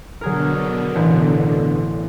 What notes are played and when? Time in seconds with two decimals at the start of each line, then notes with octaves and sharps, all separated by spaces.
0.21 B2 D3 F#3 G#4 A#4
0.95 A1